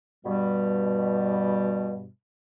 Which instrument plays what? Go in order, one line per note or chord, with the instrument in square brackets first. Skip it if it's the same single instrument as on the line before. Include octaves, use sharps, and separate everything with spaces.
[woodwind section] G2 B2 G3